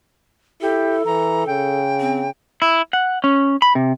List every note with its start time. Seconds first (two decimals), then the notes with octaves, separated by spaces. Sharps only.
0.62 E4 G4 A4
1.06 E3 A#5
1.47 C#3 G5
2.00 C4
2.62 E4
2.93 F#5
3.24 C#4
3.62 B5
3.75 C3